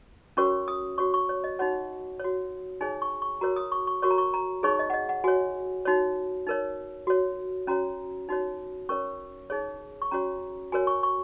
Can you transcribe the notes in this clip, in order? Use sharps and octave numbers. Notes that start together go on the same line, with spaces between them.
C#4 F#4 A#4 C#5 C#6
D#6
F#4 C#5 C#6
C#6
C#5
D#5
D#4 F#4 C#5 F#5
F#4 C#5
D#4 G#4 C#5 G#5
C#6
C#6
F#4 A#4 C#5 A#5
D#6
C#6
C#6
F#4 A#4 C#5 C#6
A#5
C#6
A#5
D#4 G#4 C#5 C#6
D#5
F#5
D#5
F#5
F#4 C#5 G#5
D#4 F#4 C#5
D#4 A#4 C#5
F#4 C#5
C#4 F#4 C#5 A#5
D#4 F#4 C#5
C#4 A#4 C#5 C#6
D#4 G#4 C#5
C#6
C#4 F#4 C#5 A#5
F#4 A#4 C#5 G#5
C#6
C#6